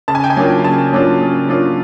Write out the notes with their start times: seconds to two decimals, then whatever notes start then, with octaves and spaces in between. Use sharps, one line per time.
0.08 C#3 A5
0.15 G#5
0.24 G5
0.30 G#5
0.37 F#3 A#3 D4 F4
0.64 C#3 A5
0.93 F#3 A#3 D4 F4
1.21 C#3
1.49 F#3 A#3 D4 F4